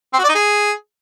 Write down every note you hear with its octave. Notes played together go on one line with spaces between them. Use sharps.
C4
F#4
D5
D#4
G#4